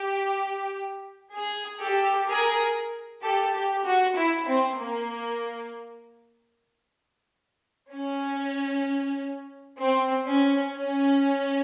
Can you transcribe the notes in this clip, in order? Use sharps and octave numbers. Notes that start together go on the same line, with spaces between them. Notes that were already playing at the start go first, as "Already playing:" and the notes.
Already playing: G4
G#4
G4 A4
G#4 A#4
G4 A4
G4
F#4
E4
C4
A#3
C#4
C4
C#4
C#4